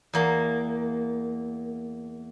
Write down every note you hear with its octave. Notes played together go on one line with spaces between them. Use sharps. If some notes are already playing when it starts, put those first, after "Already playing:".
E2 A#3